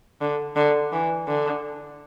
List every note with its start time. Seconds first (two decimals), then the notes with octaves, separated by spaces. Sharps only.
0.21 D3
0.56 D3
0.93 E3
1.28 D3